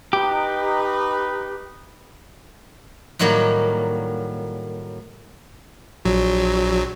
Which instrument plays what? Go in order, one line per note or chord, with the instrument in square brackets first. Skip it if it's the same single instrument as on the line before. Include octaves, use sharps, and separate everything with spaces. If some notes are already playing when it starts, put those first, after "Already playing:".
[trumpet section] D#4 B4 [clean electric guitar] G4
[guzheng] A2 D#3 F#3 G3 A#3
[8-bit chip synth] A#1 F#3